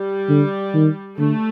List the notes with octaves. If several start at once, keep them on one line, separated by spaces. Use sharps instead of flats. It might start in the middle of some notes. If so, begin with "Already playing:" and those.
Already playing: G3
D3
D#3
D3 A3